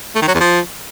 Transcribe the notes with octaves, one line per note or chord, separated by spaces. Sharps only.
A3
D#3
F#3
E2
F3